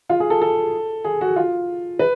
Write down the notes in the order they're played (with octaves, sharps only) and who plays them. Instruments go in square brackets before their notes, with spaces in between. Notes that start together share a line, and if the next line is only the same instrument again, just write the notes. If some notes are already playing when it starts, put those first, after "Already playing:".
[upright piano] F4
G#4
A4
A4
G#4
F#4
F4
B4